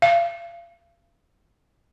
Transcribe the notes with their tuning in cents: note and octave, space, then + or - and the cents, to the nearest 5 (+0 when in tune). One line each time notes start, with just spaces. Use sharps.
F5 -35